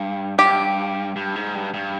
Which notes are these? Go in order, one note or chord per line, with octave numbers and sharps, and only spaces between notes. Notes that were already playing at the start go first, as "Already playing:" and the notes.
Already playing: G2
G2 G4
G2
G#2
G2
G2